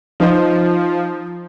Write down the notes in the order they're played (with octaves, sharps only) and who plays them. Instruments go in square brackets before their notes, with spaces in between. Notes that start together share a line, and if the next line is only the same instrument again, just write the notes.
[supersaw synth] F3 [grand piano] D#4 C5